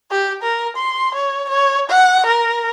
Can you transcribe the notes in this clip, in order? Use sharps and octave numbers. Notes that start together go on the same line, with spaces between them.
G4
A#4
C6
C#5
C#5
F#5
A#4